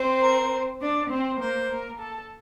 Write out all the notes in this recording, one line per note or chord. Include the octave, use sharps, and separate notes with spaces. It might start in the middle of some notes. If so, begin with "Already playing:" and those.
Already playing: C4 C5
A#4
D4 D5
C4 C5
A#3 A#4 C5
A#3 A#4
A4